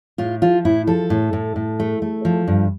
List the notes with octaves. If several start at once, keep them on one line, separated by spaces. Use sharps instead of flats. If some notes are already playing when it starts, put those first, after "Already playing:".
A2 F4
F3 F4
A2 E4
F3 A4
A2
A2
A2
A3
A3
F3
G2